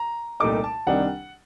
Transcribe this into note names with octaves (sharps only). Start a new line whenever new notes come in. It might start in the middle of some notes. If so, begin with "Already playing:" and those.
Already playing: A#5
C2 A#2 A3 D#4 D6
A5
C2 C3 D#3 G3 D4 F#5